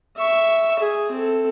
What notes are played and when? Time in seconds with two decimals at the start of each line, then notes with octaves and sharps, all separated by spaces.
0.17 E5 C#6
0.79 G#4
1.11 C4 A4